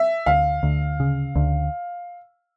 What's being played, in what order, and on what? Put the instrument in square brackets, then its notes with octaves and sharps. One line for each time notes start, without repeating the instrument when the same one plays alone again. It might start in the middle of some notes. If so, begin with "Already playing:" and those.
Already playing: [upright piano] E5
[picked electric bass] D2 [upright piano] F5
[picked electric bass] D2
C#3
D2